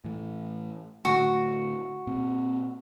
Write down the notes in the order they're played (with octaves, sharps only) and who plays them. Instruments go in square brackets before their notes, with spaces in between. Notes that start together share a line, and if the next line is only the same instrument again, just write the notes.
[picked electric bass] A2 E3
[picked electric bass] A2 D3 A3 [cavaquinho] F#4
[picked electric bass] A#2 C4